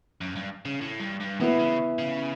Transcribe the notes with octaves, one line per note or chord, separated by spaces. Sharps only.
F#2
G2
C#3
A2
G2
G2
A2 E3 B3 E4
C#3
C#3